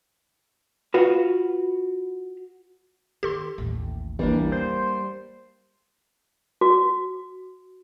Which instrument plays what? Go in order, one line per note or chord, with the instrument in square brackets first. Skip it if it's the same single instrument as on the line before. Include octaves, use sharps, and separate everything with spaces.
[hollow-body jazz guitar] F4 F#4 B4
[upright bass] D#3 [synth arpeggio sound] G4 A4 C6
[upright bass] A1 D#2
[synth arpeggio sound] G1 [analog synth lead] E3 [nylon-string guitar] G3 A#3 D4
[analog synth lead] C5
[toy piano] F#4